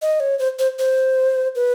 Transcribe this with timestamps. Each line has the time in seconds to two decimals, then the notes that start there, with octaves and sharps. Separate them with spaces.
0.02 D#5
0.20 C#5
0.39 C5
0.59 C5
0.79 C5
1.55 B4